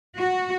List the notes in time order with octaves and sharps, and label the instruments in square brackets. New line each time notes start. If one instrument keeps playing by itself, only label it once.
[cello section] F#4